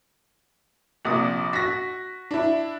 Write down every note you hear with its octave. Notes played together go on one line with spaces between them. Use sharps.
A#1 C3 D#6
F#4 A#6 B6
D4 E4